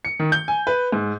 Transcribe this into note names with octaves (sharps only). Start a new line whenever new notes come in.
C#7
D#3
G6
G#5
B4
G#2